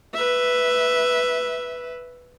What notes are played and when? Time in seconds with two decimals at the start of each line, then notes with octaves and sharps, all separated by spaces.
0.14 B4 E5